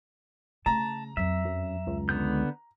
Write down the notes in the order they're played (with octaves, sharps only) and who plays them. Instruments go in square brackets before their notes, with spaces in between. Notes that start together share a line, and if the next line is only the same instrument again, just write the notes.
[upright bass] C#3 A3 [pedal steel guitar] A5 [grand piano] A#5
[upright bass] F2 F#3 [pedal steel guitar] E5
[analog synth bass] F#2
C#2
[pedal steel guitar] D3 B3 G6